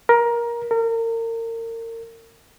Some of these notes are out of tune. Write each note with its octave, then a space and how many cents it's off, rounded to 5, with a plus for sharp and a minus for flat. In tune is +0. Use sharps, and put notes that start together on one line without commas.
A#4 +15
A#4 -35